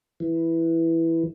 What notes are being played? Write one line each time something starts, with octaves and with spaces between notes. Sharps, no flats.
E3